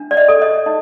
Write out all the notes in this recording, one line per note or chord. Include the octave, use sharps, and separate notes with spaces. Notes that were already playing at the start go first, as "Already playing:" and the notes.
Already playing: D4
D5
D#5
A4
D#5
D#4 D#5